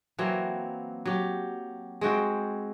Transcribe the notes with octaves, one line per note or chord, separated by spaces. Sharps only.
E3 F#3 A#3 C4
F#3 G4
G#3 C4 F#4 G5